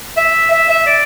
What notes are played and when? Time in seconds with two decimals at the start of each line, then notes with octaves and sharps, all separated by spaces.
0.17 E5
0.51 E5
0.69 E5
0.87 D5